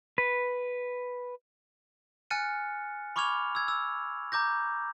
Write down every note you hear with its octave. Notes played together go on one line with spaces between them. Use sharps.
B4
G#5 F6 F#6 A6 C#7 D#7
B5 C#6 D6 F6 G#6 F7
E6 G#6
E6
A#5 D6 G6 A#6